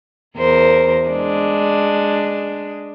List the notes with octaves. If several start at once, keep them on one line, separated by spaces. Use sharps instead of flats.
E2 A#4 C5
G#3 D4